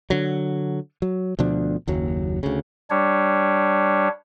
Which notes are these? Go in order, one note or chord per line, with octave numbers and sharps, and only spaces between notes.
D3 F#3
F#3
D2 B2 F3 D4
F#1 D#2 F#3
D2 C#3
G3 D4 C#5